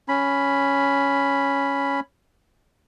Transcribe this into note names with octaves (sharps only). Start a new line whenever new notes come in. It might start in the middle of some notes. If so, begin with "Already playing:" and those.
C#4 B5